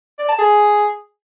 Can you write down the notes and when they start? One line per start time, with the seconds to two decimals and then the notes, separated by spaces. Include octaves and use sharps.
0.19 D5
0.29 A5
0.39 G#4